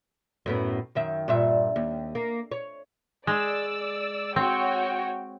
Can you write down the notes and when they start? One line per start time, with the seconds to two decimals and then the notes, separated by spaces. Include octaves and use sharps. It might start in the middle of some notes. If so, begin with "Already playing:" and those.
0.46 F#2 A2 B3
0.95 F#2 D#3 E5
1.28 G2 A#2 E5
1.76 D#2
2.15 A#3
2.51 C#5
3.27 G#3 D5 E6
4.36 C4 F#4 C#5 G5